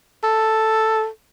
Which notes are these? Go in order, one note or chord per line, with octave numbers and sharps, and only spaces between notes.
A4